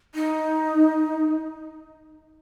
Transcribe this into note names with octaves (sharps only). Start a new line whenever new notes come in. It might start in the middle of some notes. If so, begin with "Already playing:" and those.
D#4